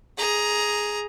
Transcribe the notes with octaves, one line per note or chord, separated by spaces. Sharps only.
G#4 A#5